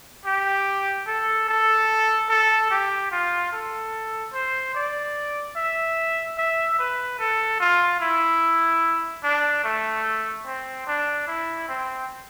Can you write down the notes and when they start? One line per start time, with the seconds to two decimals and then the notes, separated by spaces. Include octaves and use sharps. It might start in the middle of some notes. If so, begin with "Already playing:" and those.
0.26 G4
1.07 A4
1.48 A4
2.30 A4
2.70 G4
3.11 F4
3.53 A4
4.33 C5
4.75 D5
5.56 E5
6.38 E5
6.79 B4
7.19 A4
7.60 F4
8.00 E4
9.24 D4
9.64 A3
10.46 C4
10.87 D4
11.27 E4
11.69 C4